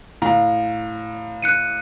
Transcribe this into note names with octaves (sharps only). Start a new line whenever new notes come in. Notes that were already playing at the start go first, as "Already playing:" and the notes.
A2 F5 A#5
F#6 C#7 D#7